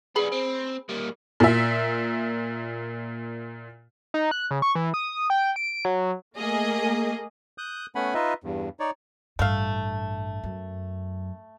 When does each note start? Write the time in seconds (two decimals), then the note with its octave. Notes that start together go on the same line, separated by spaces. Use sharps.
0.16 G3 B3 G#4 B5
0.32 C4
0.89 G3 A#3
1.40 A#2 E5
4.14 D#4
4.31 F#6
4.51 C#3
4.62 C#6
4.75 E3
4.94 D#6
5.30 G5
5.56 D7
5.85 F#3
6.37 A3 A#3 G#4 D#5
7.58 D#6 F#6 G6
7.95 A3 B3 C#4 F#5 G#5 B5
8.14 D#4 F4 B4 D#5 E5
8.44 E2 G2
8.80 D#4 C#5 D5
9.39 A1 G2 A3 F5
10.44 F#2